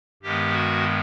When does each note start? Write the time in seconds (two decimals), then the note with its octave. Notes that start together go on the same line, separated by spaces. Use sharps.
0.23 G2 D#3 G#3 B3 G4
0.53 F#4